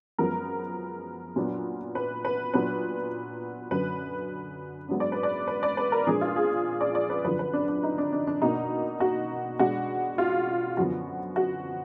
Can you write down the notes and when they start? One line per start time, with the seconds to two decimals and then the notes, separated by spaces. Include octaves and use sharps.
0.18 F#2 F3 G#3 B3 A#4
1.36 A#2 F#3 B3 D4
1.95 B4
2.25 B4
2.54 A#2 F#3 B3 D4 B4
3.71 F#2 D3 F#3 B4
4.88 G#2 F#3 B3 D4
5.00 D5
5.12 B4
5.23 D5
5.48 B4
5.63 D5
5.77 B4
5.92 A#4
6.07 A#2 F3 G#3 D4 G#4
6.21 F4
6.36 G#4
6.81 D5
6.95 D5
7.10 B4
7.24 F#2 D3 F3 B4
7.39 B4
7.53 D4
7.68 D4
7.83 D#4
7.98 D4
8.13 D4
8.27 D4
8.42 B2 A#3 D4 D#4
9.00 F#4
9.59 B2 G#3 D4 F#4
10.18 F4
10.77 F#2 D3 F3 B3 F#4
11.36 F#4